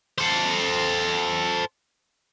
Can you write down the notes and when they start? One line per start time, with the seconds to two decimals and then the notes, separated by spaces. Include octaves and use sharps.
0.18 A4 C5